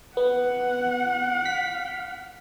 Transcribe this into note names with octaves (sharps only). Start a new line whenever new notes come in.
B3 F#5
B6